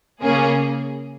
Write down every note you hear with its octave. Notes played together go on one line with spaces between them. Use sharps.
C#3 A#3 C#4 G#4